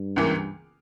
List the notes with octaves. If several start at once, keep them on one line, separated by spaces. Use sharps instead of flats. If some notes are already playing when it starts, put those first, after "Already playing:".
Already playing: G2
C#2 C#3 E3 A#3